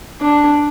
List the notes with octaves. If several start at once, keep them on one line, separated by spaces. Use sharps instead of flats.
D4